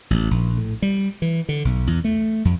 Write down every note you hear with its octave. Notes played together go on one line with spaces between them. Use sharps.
A1
A#1
A2
G3
E3
D3
B1
E2
A3
F2